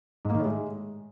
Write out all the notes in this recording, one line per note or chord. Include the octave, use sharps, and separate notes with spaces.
G#2
A#3
D#3
A2
G#3